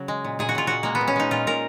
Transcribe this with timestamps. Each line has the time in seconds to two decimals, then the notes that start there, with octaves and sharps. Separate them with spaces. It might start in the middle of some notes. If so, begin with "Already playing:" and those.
Already playing: C#3 F#3
0.08 G#3
0.24 A#2
0.39 A#2 G#4
0.49 F#4
0.55 A#2 F4
0.67 A#2 F#4
0.83 G#3 A#3
0.95 B3
1.01 A#2
1.08 C#4
1.16 G#3 D#4
1.31 A#2 F4
1.47 A#2 A#4